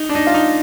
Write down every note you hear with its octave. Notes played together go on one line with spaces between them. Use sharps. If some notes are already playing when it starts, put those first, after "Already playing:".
Already playing: D#4
D4
D#4
F4
D#4